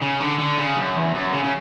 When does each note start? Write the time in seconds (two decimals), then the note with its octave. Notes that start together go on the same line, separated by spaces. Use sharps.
0.02 C#3
0.20 D3
0.39 D3
0.58 C#3
0.77 F#2
0.96 E2
1.15 F#2
1.33 C#3
1.44 C#3